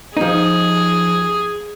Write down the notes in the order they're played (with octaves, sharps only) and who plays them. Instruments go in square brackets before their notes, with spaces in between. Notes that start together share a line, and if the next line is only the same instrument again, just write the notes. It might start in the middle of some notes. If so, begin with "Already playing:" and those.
[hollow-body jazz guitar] F3 D#4 [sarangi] G#4